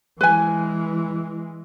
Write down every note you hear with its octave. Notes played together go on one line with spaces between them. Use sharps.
E3 G#3 B4 G#5